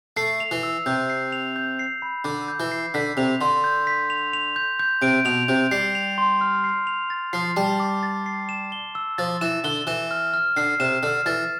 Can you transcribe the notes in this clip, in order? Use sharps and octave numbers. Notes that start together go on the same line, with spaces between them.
A3 C7
F7
E3
E6
C3 G6
C7
F7
G6
C7
B5
D3 D6
G6
E3
C7
D3 B6
C3 F7
D3 C6
G6
B6
F7
F7
G6
G6
C3 D7
B2 F7
C3 G6
G3 C7
F7
C6
F6
C7
F7
A6
F3 C7
G3 A5
D6
A6
C7
E7
G7
E6
F3 A6
E3 E7
D3 G7
E3 E7
F6
F6
D3 C7
C3 E7
D3 F6
E3 A6